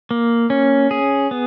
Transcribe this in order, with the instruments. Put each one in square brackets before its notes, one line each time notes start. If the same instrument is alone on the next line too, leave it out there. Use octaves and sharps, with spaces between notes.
[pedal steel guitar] A#3
C#4
G#4
B3